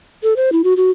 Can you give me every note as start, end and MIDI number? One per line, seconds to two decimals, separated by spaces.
0.23 0.34 69
0.36 0.52 72
0.52 0.62 64
0.64 0.74 66
0.77 0.91 66